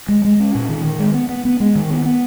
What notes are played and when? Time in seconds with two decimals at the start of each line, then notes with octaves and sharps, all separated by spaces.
0.08 G#3
0.25 G#3
0.40 C#4
0.55 A#2
0.69 D#3
0.85 D#3
0.99 G#3
1.14 B3
1.29 B3
1.45 B3
1.60 G#3
1.75 D#3
1.90 B3
2.05 B3